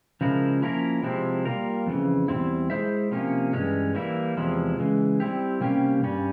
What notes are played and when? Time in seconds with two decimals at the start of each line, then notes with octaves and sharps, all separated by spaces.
0.21 C#3 F3 G#3 E4 A#4
0.62 F3 A#3 C#4 E4 A#4
1.03 C3 F3 G#3 C4 E4
1.45 G3 A#3 F4 A#4
1.86 F2 C#3 E3
2.28 E2 C3 G3 C4 E4
2.70 G#3 E4 G#4 C5 E5
3.11 C3 F3 A#3 C#4
3.53 G2 E3 G#3 C#4
3.95 E3 G3 A#3 E4
4.36 E2 C3 F3 G#3 E4
4.78 C#3 E3 G#3
5.20 G3 C4 E4 G4
5.61 C3 G3 A#3 C#4 G4
6.02 G2 G3 C#4